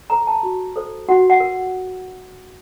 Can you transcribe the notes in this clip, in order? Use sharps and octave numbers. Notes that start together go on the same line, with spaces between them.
A4 C5 A#5
A5
F#4
A4 C5
F#4 F#5
F#5
A#4